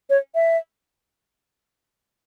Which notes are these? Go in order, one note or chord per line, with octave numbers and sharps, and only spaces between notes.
C#5
E5